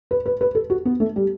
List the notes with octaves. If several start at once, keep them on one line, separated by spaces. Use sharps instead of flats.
B4
B4
B4
A4
F#4
B3
A3
G3